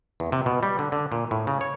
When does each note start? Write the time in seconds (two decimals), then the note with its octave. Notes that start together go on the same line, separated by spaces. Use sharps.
0.20 E2
0.32 C3
0.46 B2
0.63 G3
0.79 D3
0.92 D3
1.12 A#2
1.31 A2
1.47 C#3
1.61 C#5